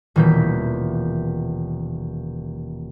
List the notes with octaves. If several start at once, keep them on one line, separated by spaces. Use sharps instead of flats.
D#1 B2 E3 A#3 G6 B6